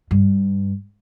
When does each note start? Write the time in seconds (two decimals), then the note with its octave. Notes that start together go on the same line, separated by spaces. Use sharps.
0.11 G2